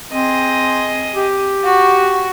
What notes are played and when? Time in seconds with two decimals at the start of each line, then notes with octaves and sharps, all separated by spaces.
0.12 C4 G#4 D#5
1.15 G4
1.64 F#4